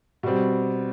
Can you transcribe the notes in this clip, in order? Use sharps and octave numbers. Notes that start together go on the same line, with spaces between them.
B2 G3 C4